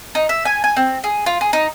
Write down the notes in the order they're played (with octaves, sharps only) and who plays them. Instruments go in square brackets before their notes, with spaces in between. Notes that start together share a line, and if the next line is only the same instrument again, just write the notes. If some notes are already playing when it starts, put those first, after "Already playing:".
[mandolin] D#4
E5
G#5
G#5
C4
G#4
F4
G#4
D#4